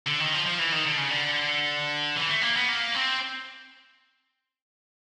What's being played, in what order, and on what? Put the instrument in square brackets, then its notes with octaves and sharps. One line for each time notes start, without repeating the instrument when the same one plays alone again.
[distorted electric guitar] D3
D#3
F3
F3
E3
D#3
D3
C#3
D3
E3
A3
A#3
B3
A#3
C4